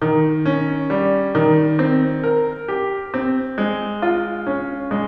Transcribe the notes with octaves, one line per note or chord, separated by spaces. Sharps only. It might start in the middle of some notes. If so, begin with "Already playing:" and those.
D#3
C#4
G3
D#3
C4
A#4
G4
C4
G#3
F4
C#4
G#3